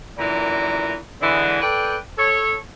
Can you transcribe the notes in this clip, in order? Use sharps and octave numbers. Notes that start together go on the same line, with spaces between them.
F#2 A#2 D3 E3 A#5
D3 E3 G#3
A4 B4 D5 G5
A4 C#5